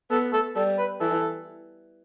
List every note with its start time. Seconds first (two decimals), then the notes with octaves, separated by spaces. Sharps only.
0.11 B3 A4
0.33 A4
0.56 G3 A4
0.78 B4
1.00 E3 A4